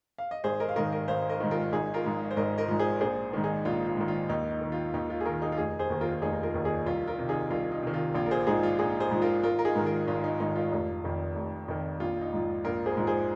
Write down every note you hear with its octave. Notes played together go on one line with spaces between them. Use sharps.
F5
D#5
G#1 G#4 C5
A#4 D#5
F5
G#2 D#3 A#4 D#5
A#4 D#5
G#1 C5 F5
A#4 D#5
G#2 D#3
F4 A#4
G#1 D#4 G#4
F4 A#4
G#2 F3
C5
G#1 A#4 D#5
A#4 D#5
G#2 F3
G#4 C5
A#1 G#4 C5
G#2 D#3
D#4 G#4
A#1 F4
F4
G#2 D#3
F4
D#2 D#4
D#4
D#3
F4
D#2 D#4
F4
G#4
D#3 F4 A#4
D#4 G#4
F4
F1 D#4 G#4
G#4 C5
D#2 D#3
F4 A#4
F4
F1 D#4 G#4
F4 A#4
D#2 D#3
D#4 G#4
C2 F4
F4 A#4
C3 D#3
D#4 G#4
C2 F4
D#4
C3 D#3
F4
A#1 F4
A#4
G#4 C5
G#2 F3 D#4 G#4
F4
A#1 D#4 G#4
G#4 C5
G#2 F3
F4 A#4
G#1 F4 A#4
A#4
D#4 G#4
G#2 D#3
F4 A#4
G#1 F4
D#4
G#2 D#3 D#4
F4
F1
F2 D#3
F1
F2 D#3
A#1 F4
D#4
G#2 F3
A#1 F4 A#4
G#4 C5
G#2 F3
G#4 C5